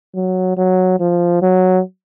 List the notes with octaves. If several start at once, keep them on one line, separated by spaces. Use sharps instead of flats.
F#3
F#3
F3
F#3